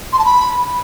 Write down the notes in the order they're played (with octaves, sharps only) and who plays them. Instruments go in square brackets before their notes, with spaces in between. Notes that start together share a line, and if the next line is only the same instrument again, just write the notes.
[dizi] C6
A5
B5